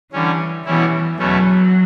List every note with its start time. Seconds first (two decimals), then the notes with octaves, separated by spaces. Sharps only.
0.11 D3 E3 G3 C#4
0.65 B2 E3 G3 C#4 E4
1.19 E2 B2 F#3 A3 C#4